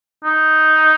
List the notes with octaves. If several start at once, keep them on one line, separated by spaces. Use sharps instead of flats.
D#4